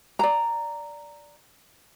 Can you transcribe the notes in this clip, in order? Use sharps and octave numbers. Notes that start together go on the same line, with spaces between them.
D5 A#5